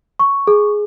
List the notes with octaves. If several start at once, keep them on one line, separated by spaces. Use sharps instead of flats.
C#6
G#4